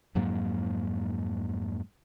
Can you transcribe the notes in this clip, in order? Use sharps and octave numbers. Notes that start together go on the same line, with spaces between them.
F2 G#2 F#3 A#3